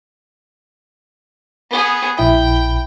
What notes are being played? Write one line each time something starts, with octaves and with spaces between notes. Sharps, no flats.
B3 G#4
A#1 E4 G5 B5